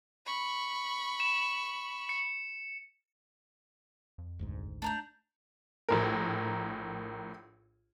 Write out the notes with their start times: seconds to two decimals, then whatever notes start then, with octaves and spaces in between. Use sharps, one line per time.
0.26 B5 C#6
1.20 E7
2.09 C#7
4.18 F2
4.39 G#1 D2 G#2
4.82 A3 D4 A#5 G6
5.89 A#1 A2 A#4